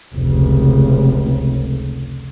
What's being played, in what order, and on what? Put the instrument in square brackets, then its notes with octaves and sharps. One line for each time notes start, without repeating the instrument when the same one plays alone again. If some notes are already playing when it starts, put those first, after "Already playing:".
[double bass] F1 C#2